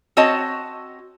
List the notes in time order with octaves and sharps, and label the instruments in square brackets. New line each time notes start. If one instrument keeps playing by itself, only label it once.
[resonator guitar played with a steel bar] C4 F#4 C#5 D#5 A5